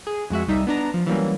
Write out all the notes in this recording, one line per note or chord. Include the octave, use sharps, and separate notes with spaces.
G#4
F2 G#3 F#4 E5
C2 G3 D#4 E5
B3 D4 A#5
F3
E3 F#3 G3 A#3 C#4